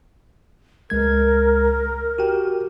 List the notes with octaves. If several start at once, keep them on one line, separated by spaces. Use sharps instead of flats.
C#2 G#3 A#4 G#6
F#4 G4 G5